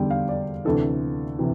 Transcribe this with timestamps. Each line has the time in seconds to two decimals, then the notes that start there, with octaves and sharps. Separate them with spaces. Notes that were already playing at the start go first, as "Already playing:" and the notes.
Already playing: E2 D3 G3 G5
0.11 F5
0.29 D5
0.65 D2 C3 E3 A4
1.39 C3 E3